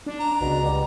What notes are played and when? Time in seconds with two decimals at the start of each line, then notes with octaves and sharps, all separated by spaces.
0.06 D4
0.20 A#5
0.41 C#2 B2
0.65 G3